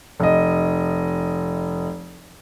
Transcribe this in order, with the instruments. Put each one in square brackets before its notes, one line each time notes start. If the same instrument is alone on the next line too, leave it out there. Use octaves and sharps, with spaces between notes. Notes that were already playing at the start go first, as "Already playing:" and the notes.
[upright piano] F1 D#5